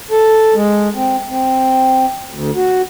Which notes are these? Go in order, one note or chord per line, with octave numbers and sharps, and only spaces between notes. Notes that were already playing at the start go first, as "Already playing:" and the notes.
A4
G#3
C4
C4
D2
F#4